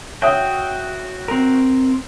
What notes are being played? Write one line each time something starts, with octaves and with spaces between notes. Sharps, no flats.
F#4 C#5 E5 G5 D#6
C4 A#4